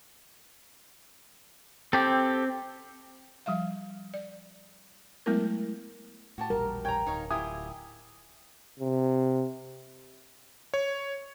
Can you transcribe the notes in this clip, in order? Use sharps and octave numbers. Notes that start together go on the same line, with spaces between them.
C4 G4 A4
F3 G3 E5 F5
D5
F#3 G#3 A3 B3 E4 A#4
A2 F#4 G4 A5
E1 A#1 G3 A#4
C#5 G5 G#5 A#5
D1 D#4 C#5 F5
E4 F4 G4 G#5 D#6
C3
C#5